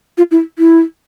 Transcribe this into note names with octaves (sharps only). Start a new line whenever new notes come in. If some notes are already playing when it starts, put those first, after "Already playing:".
F4
E4
E4